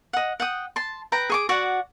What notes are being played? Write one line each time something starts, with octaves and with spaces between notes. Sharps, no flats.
D#5 F#5
F#5 G5 D#6
A5 C6
B4 G5 A#5
G#4 C#6 D6
F#4 D5 F#5